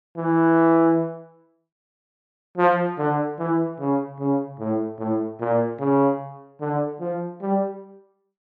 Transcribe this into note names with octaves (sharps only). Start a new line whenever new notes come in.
E3
F3
D3
E3
C#3
C#3
A2
A2
A#2
C#3
D3
F3
G3